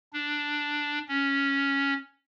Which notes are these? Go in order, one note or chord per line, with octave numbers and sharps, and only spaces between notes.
D4
C#4